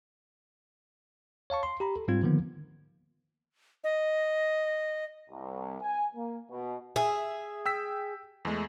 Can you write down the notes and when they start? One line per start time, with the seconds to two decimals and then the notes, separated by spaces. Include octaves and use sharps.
1.50 C#5 F5 A5 C#6
1.63 C6
1.80 G4 A#5 B5
1.96 A4
2.08 G#2 G3 C4 F4 G#6
2.23 D3 D#3 F3 A#3 B3
3.84 D#5
5.29 C2
5.81 G#5
6.15 A#3
6.50 B2
6.96 G#4 E5
7.66 G5 E6 B6
8.45 E2 G#3 A3